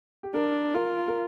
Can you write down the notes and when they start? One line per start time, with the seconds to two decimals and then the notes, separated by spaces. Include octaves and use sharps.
0.23 G4
0.34 D4 A#4
0.74 F4 A#4
1.08 A#4